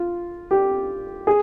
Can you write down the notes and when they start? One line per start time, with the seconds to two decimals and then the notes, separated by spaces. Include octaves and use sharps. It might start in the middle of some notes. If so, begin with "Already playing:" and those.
Already playing: F4
0.51 G4
1.27 G#4